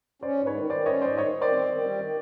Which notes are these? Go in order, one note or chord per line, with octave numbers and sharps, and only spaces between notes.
C#4 C5 D5
G#2
B4 C#5
D#3
D#3 C5 D5
C#4 C#5 D#5
G#2 C5 D5
D#3 C#5 D#5
D#3
C5 D5
C4
D#3
G3
D#3